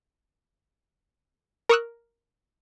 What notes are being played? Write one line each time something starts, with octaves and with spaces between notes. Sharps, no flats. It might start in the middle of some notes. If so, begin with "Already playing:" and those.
A#4 A#5 C#6 D#6 E6 F#6